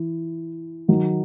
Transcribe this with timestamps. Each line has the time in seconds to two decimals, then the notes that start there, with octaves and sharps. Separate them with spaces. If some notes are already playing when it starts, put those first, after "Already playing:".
Already playing: E3
0.88 D#3 F#3